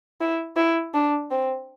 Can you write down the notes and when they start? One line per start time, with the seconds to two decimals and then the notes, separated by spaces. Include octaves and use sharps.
0.21 E4
0.56 E4
0.94 D4
1.31 C4